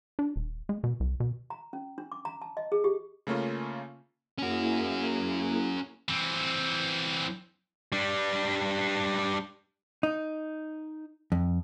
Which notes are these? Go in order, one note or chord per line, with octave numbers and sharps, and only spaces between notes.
D4
D#1
G#3
B2
C2
B2
A#5
C#4
D4
D6
A#5
A5
D#5
G#4
G4
C#3 A3 A#3 C#4 F4
A#3 C#4 E4 F#4 G#4
E3 C4
G3 D4
D#4
F2